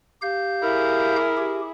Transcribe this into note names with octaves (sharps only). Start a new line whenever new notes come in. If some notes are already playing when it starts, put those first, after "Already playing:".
G4 F5 G6
E4 G#4 A#4
G4